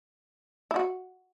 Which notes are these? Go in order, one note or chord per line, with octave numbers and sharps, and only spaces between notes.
E4
F#4